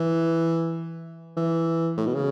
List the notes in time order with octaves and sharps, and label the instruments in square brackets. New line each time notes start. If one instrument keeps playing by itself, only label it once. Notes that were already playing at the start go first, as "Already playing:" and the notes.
Already playing: [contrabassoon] E3
E3
A2
B2
C#3